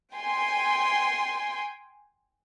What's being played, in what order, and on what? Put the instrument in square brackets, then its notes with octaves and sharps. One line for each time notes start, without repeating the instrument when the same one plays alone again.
[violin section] G5 G#5 C6